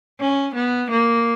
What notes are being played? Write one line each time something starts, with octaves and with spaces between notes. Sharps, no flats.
C#4
B3
A#3